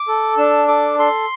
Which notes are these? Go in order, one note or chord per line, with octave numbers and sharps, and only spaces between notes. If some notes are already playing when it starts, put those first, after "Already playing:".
Already playing: D6
A4
D4 E6
A4 D6
A4 C6